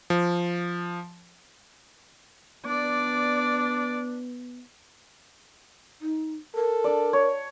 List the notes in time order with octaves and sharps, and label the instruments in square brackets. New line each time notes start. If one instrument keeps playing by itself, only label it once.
[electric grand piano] F3
[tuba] B3 [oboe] D4 [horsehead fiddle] D5
[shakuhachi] D#4
[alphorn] A4 [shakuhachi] A#4
[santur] D4 D5
C#5